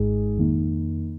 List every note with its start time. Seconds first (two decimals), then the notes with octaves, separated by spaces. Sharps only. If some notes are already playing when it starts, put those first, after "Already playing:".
Already playing: G#1 G#2 G#3 D#4 G#4
0.37 F2 D#3 A#3 D#4